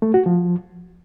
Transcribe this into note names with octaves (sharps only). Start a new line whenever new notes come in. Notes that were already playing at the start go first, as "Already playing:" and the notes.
A3
F#4
F3